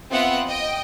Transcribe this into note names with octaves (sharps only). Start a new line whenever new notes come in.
B3 C4 F4 E5 F#5
D#5 G5